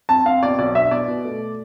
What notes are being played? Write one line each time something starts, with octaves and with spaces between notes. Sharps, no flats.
C4 A5
C4 F5
B2 D5
B1 D5
D4 E5
B2 D5
B2
A3